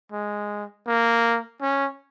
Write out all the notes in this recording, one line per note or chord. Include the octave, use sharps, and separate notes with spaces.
G#3
A#3
C#4